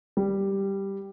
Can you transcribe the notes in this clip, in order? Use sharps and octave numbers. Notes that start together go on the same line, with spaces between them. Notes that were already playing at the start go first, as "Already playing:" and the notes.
G3